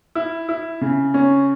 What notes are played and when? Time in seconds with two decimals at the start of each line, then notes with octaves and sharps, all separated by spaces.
0.15 E4
0.49 E4
0.81 C#3
1.14 C#4